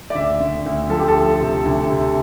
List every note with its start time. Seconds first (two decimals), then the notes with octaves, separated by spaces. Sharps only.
0.10 D5
0.15 D2 E5
0.40 D2
0.66 D2
0.90 F3 A4
0.99 G4
1.08 A4
1.15 D2
1.40 C3
1.65 D2
1.90 C3